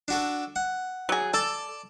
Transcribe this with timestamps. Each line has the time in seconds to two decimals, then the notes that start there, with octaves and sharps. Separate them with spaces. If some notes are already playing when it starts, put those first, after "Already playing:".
0.08 D4 F#4 A4
0.56 F#5
1.09 F#3 G#4
1.34 A4 D5 A5 D6